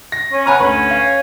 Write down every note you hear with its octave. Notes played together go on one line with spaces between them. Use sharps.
A#6
C#4
B3 G#5 A#5 F6
D2 C#4 B4
F5